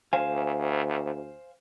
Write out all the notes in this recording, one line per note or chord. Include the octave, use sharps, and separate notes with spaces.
D2 C5 F5 G#5